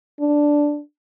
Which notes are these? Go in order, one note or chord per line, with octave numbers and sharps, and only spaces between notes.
D4